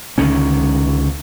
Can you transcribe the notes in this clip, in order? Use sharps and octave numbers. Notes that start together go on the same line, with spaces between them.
C#2 D3 D#3 C#4